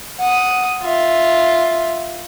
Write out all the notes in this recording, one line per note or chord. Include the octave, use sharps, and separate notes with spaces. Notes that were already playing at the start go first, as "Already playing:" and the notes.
F#5 D#6
F4 E5